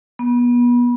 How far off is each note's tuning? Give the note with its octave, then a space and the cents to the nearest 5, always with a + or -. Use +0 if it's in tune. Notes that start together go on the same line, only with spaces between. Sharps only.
B3 -30